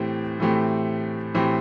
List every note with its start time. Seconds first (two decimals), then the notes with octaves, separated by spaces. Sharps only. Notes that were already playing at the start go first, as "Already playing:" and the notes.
Already playing: A2 E3 A3 C4 G4
0.40 A2 E3 A3 C4 G4
1.34 A2 E3 A3 C4 G4